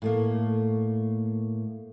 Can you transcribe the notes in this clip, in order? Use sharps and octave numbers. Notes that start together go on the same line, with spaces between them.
A2 A3 A#3